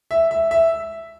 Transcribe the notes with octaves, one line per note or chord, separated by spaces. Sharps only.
E5
E5
E5